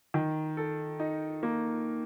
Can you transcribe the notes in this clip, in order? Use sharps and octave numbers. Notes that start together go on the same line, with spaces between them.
D#3
A4
D#4
A#3